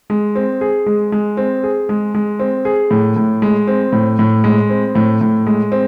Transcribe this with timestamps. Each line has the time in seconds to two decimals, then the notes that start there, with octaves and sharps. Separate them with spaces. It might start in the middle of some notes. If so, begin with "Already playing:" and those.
0.10 G#3
0.35 C4
0.61 G#4
0.86 G#3
1.12 G#3
1.37 C4
1.63 G#4
1.89 G#3
2.15 G#3
2.40 C4
2.65 G#4
2.91 A2
3.16 A2
3.42 G#3
3.67 C4
3.92 A2
4.19 A2
4.44 G#3
4.70 C4
4.95 A2
5.21 A2
5.47 G#3
5.72 C4